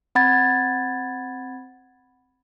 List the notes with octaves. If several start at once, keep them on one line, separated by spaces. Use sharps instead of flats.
C4 F#5 B5 G#6 A6